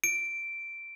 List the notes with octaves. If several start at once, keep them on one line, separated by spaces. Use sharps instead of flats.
D7